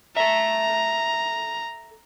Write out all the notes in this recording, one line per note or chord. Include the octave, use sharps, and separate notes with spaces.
A4 E5 A#5